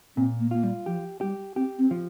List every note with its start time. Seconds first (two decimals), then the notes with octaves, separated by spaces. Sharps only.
0.16 A#2 C4
0.40 A#3
0.51 A#3 F4
0.64 G3
0.86 F3 G4
1.21 G3 G4
1.56 C4 G4
1.79 C4
1.91 F3